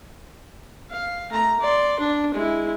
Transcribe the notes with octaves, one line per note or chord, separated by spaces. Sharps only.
F5
A3 A#5
D5 C6
D4
G#3 E4